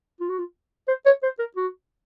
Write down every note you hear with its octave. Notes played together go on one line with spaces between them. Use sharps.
F4
F#4
F4
C5
C#5
C5
A#4
F#4